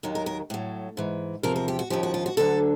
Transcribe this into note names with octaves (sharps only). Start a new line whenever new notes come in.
D#2 D#3 F#3
A#4
A#4
A2 F#3
G#2 E3
E2 C3 F3 A#4
A#4
G4
F#4
D#2 C#3 F3 G4
F#4
F4
F#4
D2 D3 F#3 A4